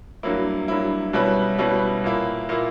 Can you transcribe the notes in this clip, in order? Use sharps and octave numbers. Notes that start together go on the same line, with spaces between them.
G2 F#3 A#3 E4
G2 F#3 A#3 E4
B2 G3 C#4 E4 B4
B2 G3 C#4 E4 B4
A#2 A#3 E4
A#2 A#3 E4